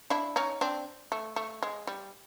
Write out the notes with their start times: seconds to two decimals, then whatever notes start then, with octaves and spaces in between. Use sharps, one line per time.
0.10 D4 E4
0.36 C#4 D#4
0.61 C4 D4
1.12 A3
1.36 A3
1.63 G#3
1.87 G3